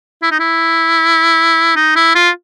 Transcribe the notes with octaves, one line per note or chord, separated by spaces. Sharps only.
E4
D#4
E4
D#4
E4
F4